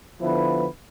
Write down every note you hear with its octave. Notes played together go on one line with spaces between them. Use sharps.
D3 F3 B3 E4 B4